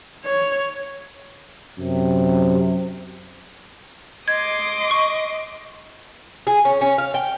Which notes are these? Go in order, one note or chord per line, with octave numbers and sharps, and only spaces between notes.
C#5
F#2 C3
D#5 C6 D6 D#6 G#6
C#6
G#4
C#4
C#4
F5
G5